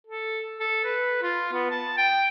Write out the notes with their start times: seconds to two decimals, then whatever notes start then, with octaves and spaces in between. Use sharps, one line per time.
0.07 A4
0.60 A4
0.84 B4
1.22 F4
1.53 B3
1.71 A5
1.97 G5